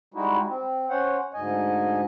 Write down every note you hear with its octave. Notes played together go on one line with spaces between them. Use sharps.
G3 G#3 D#4 E4 F#4
C4
C#4 C5 C#5 F#5
D2 G#2 D#5 G#5